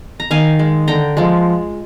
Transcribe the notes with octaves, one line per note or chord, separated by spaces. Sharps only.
A#5
D#3 F5 G#5
G#3
D3 G5 A#5
F3 G#3